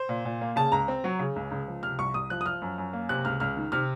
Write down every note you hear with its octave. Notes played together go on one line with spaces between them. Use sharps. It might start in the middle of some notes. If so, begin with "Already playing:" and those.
Already playing: C5
A#2
A#2
A#3
C#3 A5
C#2 A#5
C4
F#3
C#3
C#2
C#2
F3
C3 F6
C2 C#6
C2 D#6
F3 F#6
D#6
F3 F6
F#2
F#2
A#3
C3 F#6
C#2 F6
C#2 F6
D#3
C3 F6